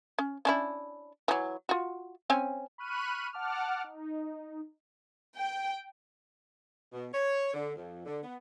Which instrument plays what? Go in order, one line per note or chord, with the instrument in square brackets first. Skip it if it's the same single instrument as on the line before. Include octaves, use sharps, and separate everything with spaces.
[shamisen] C#4
C#4 D4 E4
E3 F#3
F4 F#4
C4 C#4 G#5
[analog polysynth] B5 C#6 F6 F#6 D#7
F#5 A5 D6 F6
D#4
[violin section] G5
[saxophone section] B2
C#5
D3
F2
D3
B3